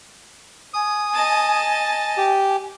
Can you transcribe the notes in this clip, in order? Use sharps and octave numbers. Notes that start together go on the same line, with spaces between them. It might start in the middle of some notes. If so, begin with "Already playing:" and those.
G#5 D#6
D#5 A5
G4